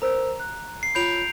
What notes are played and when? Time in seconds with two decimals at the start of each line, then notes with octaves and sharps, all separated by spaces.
0.02 A#4 C5 A#5 E6
0.40 F#6
0.83 C7
0.95 F4 C#5 B5 G6 D7 F7